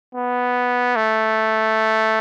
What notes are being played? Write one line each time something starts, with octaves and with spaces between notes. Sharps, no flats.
B3
A3